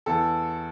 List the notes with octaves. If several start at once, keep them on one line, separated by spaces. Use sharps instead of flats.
E2 A4